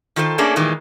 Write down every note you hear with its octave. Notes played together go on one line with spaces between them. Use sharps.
D#3 F4 A4 C5
A3 A#3 C#4 D4 G#4 A4
A#2 D#3 E3 G3 G#3